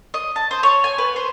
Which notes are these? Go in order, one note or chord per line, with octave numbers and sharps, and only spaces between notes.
D#5
A5
C5
C#5
G#5
B4
C5